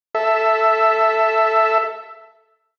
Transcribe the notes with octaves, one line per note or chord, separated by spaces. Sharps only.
A4 E5